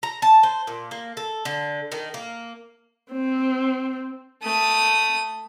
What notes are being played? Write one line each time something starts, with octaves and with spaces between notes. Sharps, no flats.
A#5
A5
C5
A#2
A#3
A4
D3
D#3
A#3
C4
A3 D#6